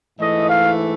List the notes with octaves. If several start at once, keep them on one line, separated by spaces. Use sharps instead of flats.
G#2 E3 A3 D#5
F5